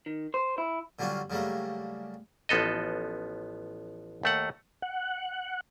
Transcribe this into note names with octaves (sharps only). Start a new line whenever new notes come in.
D#3
C5
E4
D3 F#3 G3 C#4 F4 F#4
C#3 F#3 G3 A3 A#3
A1 F3 B3 A4 D#5
D#2 A3 F#5
F#5